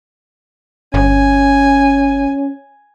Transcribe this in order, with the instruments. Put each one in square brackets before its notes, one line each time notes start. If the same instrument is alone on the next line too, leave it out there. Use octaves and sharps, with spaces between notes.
[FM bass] G1 [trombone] C#4 [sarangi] G#5